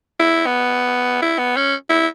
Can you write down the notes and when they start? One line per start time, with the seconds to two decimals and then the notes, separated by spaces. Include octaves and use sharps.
0.20 E4
0.46 B3
1.22 E4
1.38 B3
1.56 C#4
1.89 E4